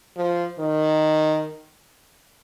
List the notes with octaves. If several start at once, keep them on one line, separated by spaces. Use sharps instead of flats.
F3
D#3